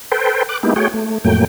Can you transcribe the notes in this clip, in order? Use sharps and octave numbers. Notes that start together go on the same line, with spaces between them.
A4 B4 C5 G5
D6 F#6
G#3 A#3 B3 D#4 E4 G4
A3 F#4 G#4 C#5 G5
A3
F2 A2 F#3 A3 A#3 G5